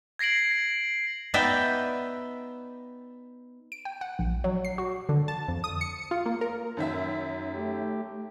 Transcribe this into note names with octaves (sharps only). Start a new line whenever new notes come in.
G#6 A#6 C7 D7 F#7
B3 D#4 D5 E5 G5
D7
G5
F#5
A#1
F#3
C7
F#4
D3
A5
F2
D#6
C#7
F4
A#3
A#4
F#2 D#3 E5
A3 G4